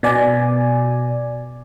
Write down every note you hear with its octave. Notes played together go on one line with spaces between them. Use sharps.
B2 D5 G#5